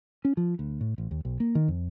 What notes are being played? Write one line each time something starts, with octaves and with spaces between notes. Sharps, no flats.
C#4
F3
D2
A2
A1
D#2
B1
A#3
D#3
F2